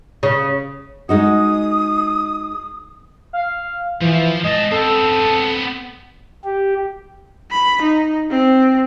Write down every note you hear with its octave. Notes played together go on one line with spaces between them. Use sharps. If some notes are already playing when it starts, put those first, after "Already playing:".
C#3
G#3 D#4 F#4 D#6
F5
E3 F3
G#3 D#5 A5
B3 C4 A4
G4
B5
D#4
C4